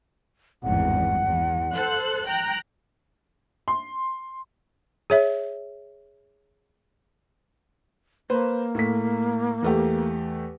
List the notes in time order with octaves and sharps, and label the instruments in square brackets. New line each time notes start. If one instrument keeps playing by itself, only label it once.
[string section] G#1 E2 G2 [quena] F#5
[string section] E2
A4 C5 F#6
G5 A#5 F#6
[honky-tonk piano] C6
[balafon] G#4 C#5 E5
[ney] A#3 [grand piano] B4 C5
[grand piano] A2 A3 B6
E2 A3 G4